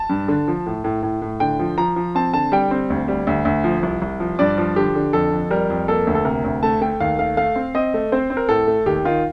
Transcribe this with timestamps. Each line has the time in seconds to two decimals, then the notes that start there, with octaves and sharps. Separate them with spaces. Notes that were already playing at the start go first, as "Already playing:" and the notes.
Already playing: A5
0.10 G2
0.28 D3
0.48 F3
0.66 A2
0.84 A2
1.03 A2
1.22 A2
1.40 D3 G5
1.59 F3
1.78 F3 A#5
1.96 F3
2.15 C4 A5
2.33 D3 A5
2.52 G3 G5
2.71 C4
2.90 D2
3.08 G3
3.27 D2
3.45 D2
3.64 F3
3.83 C2
4.02 C2
4.20 F3
4.39 G2 D5
4.58 F3
4.76 D3 G4
4.95 D3
5.13 F2 A4
5.32 F2
5.50 G3 A#4
5.70 F2
5.88 A#3 A4
6.07 D2
6.15 A4
6.25 C3 A#4
6.44 D2
6.63 A3 A5
6.81 A3 G5
7.00 D#2 F5
7.18 A3 F5
7.37 A3 F5
7.56 C4
7.75 C4 D#5
7.94 A3
8.12 C4 C5
8.30 C4
8.37 A#4
8.49 A2 A4
8.67 A3
8.86 D#2 G4
9.05 D#3 F4